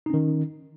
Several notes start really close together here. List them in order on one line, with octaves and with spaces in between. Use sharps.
D#4 C#4 D#3